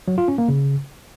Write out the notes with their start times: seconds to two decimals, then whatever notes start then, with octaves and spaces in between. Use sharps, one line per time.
0.08 F#3
0.18 F4
0.28 C#4
0.38 A#3
0.48 C#3